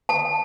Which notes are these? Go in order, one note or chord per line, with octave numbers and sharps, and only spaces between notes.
A5